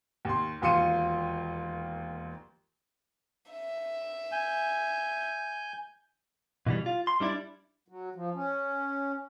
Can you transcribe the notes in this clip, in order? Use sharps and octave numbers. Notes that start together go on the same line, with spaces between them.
D#2 C6
E1 D#2 F4 C6 C#7 D#7
E5
G#5 G6
B2 E3 G3
F4
C6
G3 D4 E4 D5
F#3
F3
C#4